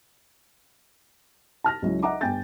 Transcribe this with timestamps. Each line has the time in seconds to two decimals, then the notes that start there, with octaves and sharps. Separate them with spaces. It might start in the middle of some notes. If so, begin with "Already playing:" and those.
1.64 A5 F6 A#6
1.82 C#2 F#3 E4
2.03 D#5 E5 F#5 A#5 D6
2.21 G1 G5 G#5 G6 A6